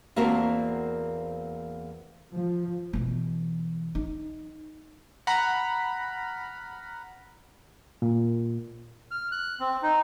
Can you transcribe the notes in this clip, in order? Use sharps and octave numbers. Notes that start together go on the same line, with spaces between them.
E2 A#3 C4 F#4 A#4 A5
F3
B2 E3
D#4
F#5 A#5 B5 F6
A#2
F6
F#6
C4
D#4